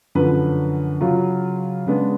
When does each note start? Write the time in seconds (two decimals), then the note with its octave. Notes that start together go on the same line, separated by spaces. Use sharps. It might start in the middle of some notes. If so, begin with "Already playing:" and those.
0.15 F#2 D3 F3 B4
1.01 C#3 F#3 C#4 F4
1.86 C#3 G#3 B3 D4